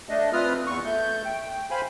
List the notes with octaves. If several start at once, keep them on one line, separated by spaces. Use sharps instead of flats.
A3 D4 D#5
C4 F4 B4 D#6 F6
E2 C#6
A3 G6
G5
C5 F5 G#5 B5